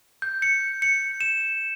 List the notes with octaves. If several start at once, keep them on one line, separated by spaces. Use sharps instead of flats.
G6
C#7
C#7
E7